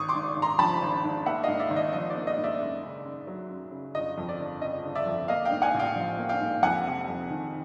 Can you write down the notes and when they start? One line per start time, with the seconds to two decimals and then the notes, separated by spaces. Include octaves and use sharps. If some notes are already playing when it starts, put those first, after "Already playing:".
Already playing: G#1 C#6 D#6
0.09 C6 D6
0.15 G#2
0.37 G#1
0.42 A#5 C6
0.59 F3 A5 B5
0.82 G#1
1.04 G#2
1.26 A#3 E5 F#5
1.43 G#2 D#5 F5
1.59 D5 E5
1.70 G#1
1.76 D#5
1.93 F3 D#5
2.10 D5
2.16 A#3
2.27 D#5
2.37 G#2
2.43 D5 E5
2.61 F#2
2.83 C#3
3.05 F#2
3.27 F#3
3.50 F#2
3.72 C#3
3.95 G1 D#5
4.18 F2
4.29 D5
4.40 G1
4.61 C#3 D#5
4.85 G1
4.95 D5 E5
5.06 F2
5.28 A#3 D#5 F5
5.45 F5 G5
5.51 G#2
5.62 F#5 G#5
5.74 A1
5.79 F5 G5
5.96 F3
6.18 A#3
6.29 F5 G5
6.41 G#2
6.63 F2 F#5 G#5
6.86 C3
7.08 F2
7.30 D#3